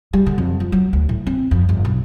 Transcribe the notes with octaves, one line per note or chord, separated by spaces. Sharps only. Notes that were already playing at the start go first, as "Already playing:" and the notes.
G3
D3
F2
F4
F#3
D2
A2
C4
F2
G1
B1